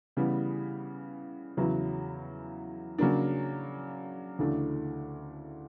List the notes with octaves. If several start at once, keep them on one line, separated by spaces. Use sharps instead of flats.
C#3 E3 G3 B3
E2 C#3 F#3 B3 E4
C#3 F#3 A#3 D4
D2 C#3 E3 A3 D4